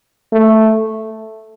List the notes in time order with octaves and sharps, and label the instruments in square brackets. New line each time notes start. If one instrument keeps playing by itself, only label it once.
[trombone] A3